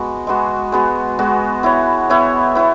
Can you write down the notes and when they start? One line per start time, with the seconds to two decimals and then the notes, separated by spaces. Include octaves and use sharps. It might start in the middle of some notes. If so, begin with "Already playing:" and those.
Already playing: G#3 B3 F#4
0.27 G#3 B3 F#4
0.72 G#3 B3 F#4
1.19 G#3 B3 F#4
1.63 B3 E4 C#5
2.10 B3 E4 C#5
2.55 B3 E4 C#5